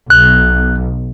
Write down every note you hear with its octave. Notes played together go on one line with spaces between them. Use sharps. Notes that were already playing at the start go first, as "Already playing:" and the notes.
B1 F#6